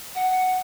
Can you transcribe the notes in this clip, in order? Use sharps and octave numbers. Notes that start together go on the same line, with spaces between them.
F#5